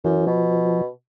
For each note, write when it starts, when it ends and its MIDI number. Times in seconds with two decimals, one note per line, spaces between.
0.04 0.26 42
0.04 0.27 52
0.27 0.87 47
0.27 0.81 53